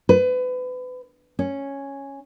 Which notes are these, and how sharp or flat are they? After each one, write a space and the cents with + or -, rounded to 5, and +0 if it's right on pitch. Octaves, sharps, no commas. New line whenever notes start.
B4 +30
C#4 -5